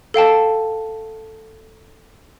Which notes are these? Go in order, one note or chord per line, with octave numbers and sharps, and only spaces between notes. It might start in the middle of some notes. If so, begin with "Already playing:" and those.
A4 F5 G5 A5